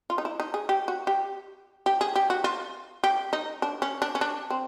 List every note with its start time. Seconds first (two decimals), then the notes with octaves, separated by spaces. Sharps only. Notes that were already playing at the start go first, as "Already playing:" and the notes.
0.10 F4
0.18 D#4
0.25 E4
0.40 D#4
0.54 G#4
0.69 G4
0.88 F#4
1.07 G4
1.86 G4
2.01 G#4
2.16 G4
2.30 F#4
2.44 F4
3.04 G4
3.33 D#4
3.62 D4
3.82 C#4
4.02 D4
4.15 C#4
4.21 D4
4.50 C4